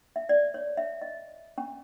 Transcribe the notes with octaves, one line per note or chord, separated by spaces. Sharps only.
E5
D5
C#5
E5
D#5
C#4